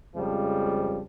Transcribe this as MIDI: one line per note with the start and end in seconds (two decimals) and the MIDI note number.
0.16 1.00 41
0.16 1.00 49
0.16 1.00 53
0.16 1.00 55
0.16 1.00 56